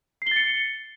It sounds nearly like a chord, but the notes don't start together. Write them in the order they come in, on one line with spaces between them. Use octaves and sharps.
C7 G7 A6 C#7